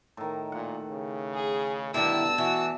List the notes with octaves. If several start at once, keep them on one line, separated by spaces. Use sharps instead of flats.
A2 D#3
A#2 F#5
C#3
G#4
G2 B2 D3 D#3 E4 D5 A5 E6
E3 F#4